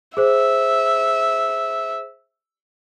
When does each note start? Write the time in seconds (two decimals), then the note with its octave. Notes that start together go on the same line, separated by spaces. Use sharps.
0.17 G#4 C5 E5